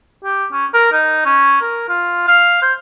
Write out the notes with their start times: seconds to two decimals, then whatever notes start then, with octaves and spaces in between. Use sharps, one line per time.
0.24 G4
0.52 C#4
0.74 A#4
0.92 D#4
1.25 C#4
1.61 A#4
1.89 F4
2.28 F5
2.62 C5